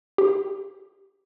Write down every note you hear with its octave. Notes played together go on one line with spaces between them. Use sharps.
G4